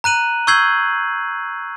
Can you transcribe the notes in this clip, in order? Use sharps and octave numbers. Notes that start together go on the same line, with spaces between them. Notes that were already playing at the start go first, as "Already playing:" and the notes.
A#5 F#6 D#7 F#7
C#6 E6 G6 G#6 C7 F#7